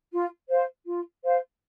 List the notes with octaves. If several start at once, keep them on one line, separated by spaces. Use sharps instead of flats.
F4
C5 F5
F4
C5 F5